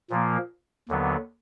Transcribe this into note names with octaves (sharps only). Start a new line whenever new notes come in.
A#2 F3 A#3
D#2 D3 F#3 B3